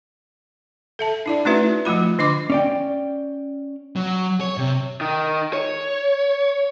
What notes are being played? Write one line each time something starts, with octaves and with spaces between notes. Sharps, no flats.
A4 E5 A5
D4 E4 D5
A3 C#4 D#4 F#4 B4 E5
F3 A3 F4 B5
D3 D4 D#5 C6 D6
C#4 D5 G5
F#3
C#5
C3
D#3
C#5